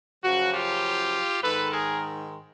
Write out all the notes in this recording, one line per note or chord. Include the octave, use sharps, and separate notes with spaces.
F#2 C#3 F3 F#4
F4 G4
G#2 D#3 G#3 A4 B4
G#4 A#4